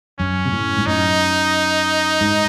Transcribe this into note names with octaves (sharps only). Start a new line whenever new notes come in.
F#2 C#4
C3
A2
G#2
F#2 D#4
G#2